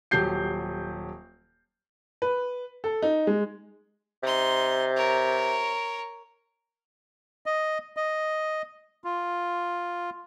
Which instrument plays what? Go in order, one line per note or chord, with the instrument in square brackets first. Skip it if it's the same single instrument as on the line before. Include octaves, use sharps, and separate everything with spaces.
[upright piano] D#1 F#3 G4 G6 C7
B4
A4
D#4
G#3
[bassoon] C3 [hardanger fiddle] D#4 C6
[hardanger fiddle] A#4 C#5
[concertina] D#5
D#5
F4